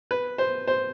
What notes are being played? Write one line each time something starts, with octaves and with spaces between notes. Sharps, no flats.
B4
C5
C5